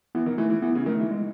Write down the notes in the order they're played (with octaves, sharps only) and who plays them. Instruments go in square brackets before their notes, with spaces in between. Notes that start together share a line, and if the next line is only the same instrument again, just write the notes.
[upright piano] E3 [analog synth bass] B3
[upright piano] D#3
[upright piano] E3 [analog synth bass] A3
[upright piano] E3
[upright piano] E3 [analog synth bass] B3
[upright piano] C#3
[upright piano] D#3 [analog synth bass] A3
[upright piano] E3
[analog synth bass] G#3